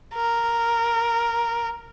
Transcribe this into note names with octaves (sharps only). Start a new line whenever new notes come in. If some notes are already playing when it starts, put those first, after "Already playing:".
A#4